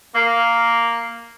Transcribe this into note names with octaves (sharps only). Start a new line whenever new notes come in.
A#3